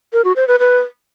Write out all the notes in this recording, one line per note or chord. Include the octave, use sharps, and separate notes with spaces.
A#4
F#4
C5
B4
B4